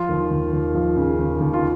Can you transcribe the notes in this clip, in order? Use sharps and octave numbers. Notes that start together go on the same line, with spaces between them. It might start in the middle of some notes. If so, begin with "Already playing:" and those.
Already playing: F3 F4
D#2
D#2
D#2
F3
C#3
D#2
D#2
F4